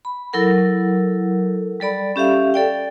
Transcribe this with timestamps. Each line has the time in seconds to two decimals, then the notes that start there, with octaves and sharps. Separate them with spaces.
0.05 B5
0.33 F#3 E4 A4 A#4 F#5
1.80 G3 A4 D5 B5
2.16 C#4 G4 E5 F5
2.54 A4 D5 G5